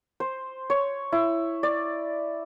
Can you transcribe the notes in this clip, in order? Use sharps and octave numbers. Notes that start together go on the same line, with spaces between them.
C5
C#5
E4
D5